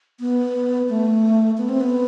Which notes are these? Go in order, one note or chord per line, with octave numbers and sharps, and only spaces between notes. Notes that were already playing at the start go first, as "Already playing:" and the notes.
B3
A3
B3
C4
B3